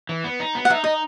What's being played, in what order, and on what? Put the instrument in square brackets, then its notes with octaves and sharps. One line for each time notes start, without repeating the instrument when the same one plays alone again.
[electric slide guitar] E3
B3
D#4
B3
[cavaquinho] F#5
[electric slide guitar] D#4 [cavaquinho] E5
[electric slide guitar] D#4 [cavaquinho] D#5